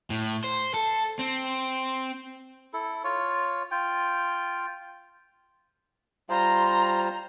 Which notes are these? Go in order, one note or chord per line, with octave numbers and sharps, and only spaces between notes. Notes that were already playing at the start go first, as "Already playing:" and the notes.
A2
C5
A4
C4
E4 A4
F4 C#5
F4 G5
G3 F4 C5 A#5